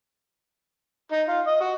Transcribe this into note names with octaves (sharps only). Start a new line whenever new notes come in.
D#4
F4
D#5
F#4